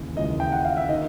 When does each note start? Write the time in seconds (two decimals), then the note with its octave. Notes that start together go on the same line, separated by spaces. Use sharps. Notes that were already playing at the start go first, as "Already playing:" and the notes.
Already playing: D#2 C#3 E3
0.16 D#2 C#3 E3 G#3 D#5
0.40 G5
0.52 F#5
0.65 F5
0.77 E5
0.89 D#3 D#5